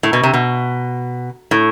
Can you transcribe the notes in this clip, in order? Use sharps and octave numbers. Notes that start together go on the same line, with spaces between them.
A2
B2
C3
B2
A2